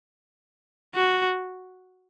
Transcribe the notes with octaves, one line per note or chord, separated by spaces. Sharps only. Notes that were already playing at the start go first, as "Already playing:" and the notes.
F#4